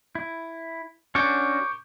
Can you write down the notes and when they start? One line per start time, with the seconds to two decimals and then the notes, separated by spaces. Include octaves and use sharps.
0.15 E4
1.15 C#4 D4 F#4 C#6 D6 G6